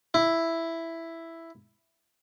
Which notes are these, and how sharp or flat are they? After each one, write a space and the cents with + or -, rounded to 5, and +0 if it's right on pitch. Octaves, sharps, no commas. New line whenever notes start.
E4 +5